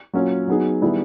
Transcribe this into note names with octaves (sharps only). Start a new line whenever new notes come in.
F#3 A#3 C#4 F4
F#3 B3 D#4 G#4
D#3 G3 B3 E4 G#4